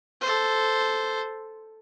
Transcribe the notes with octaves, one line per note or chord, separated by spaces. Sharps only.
A4 C5